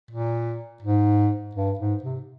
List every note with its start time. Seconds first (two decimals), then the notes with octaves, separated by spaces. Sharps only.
0.11 A#2
0.83 G#2
1.55 G2
1.79 G#2
2.03 C3